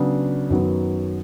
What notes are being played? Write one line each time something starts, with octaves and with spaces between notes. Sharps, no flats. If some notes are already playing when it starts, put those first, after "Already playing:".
Already playing: C#3 F#3 B3 D4
F#2 D#3 F#3 B3